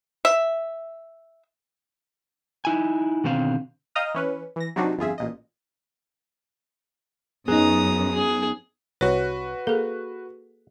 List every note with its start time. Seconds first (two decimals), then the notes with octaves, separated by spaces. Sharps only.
0.25 E5
2.65 D#4 E4 G#5
3.24 B2 D3 D#3 C4 F5
3.95 D#5 F5 G5 A#5 D#6 F6
4.15 E3 C#4 B4
4.56 E3 A#6
4.76 C3 F#3 C4 D4 D#4 F#4
4.98 G1 F2 F4 G#4 E5
5.18 A1 A#2 D#5
7.48 F#2 B3 D#4 G#4 A#5 D#6
8.14 G#4
9.01 C2 F#4 B4 C#5
9.67 A#3 G#4 A4